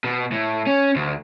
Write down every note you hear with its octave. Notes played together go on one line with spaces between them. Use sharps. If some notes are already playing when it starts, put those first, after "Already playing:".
B2
A2
C#4
D2